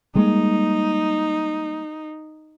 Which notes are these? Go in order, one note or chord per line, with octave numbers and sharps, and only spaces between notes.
G3 G#3 A#3 D#4